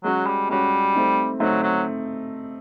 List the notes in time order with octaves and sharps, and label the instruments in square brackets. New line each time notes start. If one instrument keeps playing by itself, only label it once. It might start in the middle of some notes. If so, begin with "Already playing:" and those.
[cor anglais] F#3 [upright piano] G#3 C#4 F#4
[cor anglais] G3
[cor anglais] G3 [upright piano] G#3 C#4 F#4
[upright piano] A3 C4 D#4
[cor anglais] F#3 [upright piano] A3 C4 D#4
[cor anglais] F#3